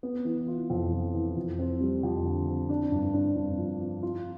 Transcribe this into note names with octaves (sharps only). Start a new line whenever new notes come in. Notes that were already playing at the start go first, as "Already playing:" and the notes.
B3
E3
F4
F2
F2
E3
F2
C4
G3
F2
D3
C4
D4
G2
D4
G2
F3
F3
F4